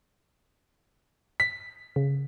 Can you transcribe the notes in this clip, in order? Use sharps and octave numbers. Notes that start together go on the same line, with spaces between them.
B6
C#3